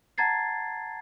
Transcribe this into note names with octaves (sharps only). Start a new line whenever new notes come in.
F#5 A5 A#5 G#6 A6 C7